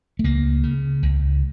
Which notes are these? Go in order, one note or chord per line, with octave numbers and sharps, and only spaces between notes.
A3
C#2 A#3
C#3
C#2